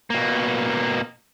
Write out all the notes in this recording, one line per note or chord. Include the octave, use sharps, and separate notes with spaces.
B2 A#3